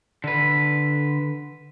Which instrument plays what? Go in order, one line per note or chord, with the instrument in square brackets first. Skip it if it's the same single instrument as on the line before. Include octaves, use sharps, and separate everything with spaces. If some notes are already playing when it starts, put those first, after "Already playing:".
[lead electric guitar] D3 B4